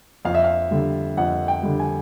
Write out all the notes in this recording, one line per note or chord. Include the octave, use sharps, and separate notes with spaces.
F2 F5
E5
F5
D3 G3
F2 F#5
G5
D3 G3
G#5